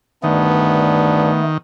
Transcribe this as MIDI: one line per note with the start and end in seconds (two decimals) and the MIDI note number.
0.24 1.31 38
0.24 1.31 43
0.24 1.58 51
0.24 1.43 57
0.24 1.60 59
0.24 1.31 62